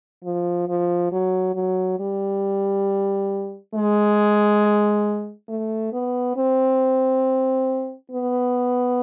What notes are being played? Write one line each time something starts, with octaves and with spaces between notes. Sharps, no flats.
F3
F3
F#3
F#3
G3
G#3
A3
B3
C4
B3